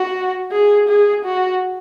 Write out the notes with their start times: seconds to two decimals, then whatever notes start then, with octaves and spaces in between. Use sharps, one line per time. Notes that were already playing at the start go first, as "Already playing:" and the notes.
Already playing: F#4
0.52 G#4
0.88 G#4
1.25 F#4